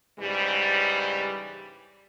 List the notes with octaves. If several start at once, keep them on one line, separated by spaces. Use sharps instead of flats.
G#2 C#3 E3 G3